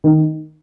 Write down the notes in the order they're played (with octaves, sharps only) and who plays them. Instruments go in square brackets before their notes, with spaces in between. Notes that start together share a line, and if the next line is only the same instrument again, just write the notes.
[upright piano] D#3